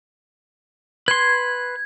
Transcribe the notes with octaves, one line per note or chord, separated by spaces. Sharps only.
B4 C6 G#6